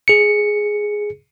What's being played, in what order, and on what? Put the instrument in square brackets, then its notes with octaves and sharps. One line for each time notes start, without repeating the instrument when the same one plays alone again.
[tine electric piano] G#4 C#7